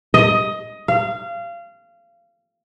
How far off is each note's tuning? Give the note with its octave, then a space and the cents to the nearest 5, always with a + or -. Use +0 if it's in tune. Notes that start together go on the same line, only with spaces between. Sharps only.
D#5 +15
F5 -25